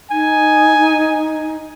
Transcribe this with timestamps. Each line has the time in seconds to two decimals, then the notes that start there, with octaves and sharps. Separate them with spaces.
0.11 D#4 G#5